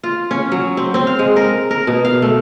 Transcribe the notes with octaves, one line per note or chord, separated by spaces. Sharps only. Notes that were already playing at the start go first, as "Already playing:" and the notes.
F4
C#4
F#3
C4
C4
F5
G#3
A#4
A#4
B2
F5
A3